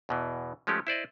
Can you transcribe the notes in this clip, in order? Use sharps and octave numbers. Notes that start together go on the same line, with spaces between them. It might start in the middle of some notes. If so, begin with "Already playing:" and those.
E2 B2 E3
F3 G#3 A3 C#4 G4
E4 C5 D5 D#5